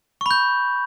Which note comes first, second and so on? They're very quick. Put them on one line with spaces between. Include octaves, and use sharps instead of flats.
C#6 B5 G6